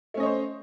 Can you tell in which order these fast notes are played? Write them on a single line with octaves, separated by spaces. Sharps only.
A3 C#4 D#5 C#5 C5